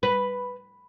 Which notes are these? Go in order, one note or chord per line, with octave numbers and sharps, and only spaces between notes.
B4